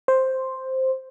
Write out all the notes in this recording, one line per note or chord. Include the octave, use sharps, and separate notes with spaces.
C5